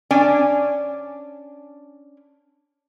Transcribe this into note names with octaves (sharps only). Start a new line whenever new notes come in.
C#4 D4 D5 G#5